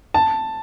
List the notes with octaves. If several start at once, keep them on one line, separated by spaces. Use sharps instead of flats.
A5